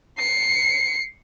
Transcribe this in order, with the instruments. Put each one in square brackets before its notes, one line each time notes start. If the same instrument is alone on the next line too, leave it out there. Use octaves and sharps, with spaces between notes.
[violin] C7 C#7